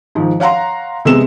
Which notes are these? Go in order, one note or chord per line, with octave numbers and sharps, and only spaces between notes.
G#2 D#3 F3
C#5 F5 F#5 A#5 C6
C3 G#3 B3 E7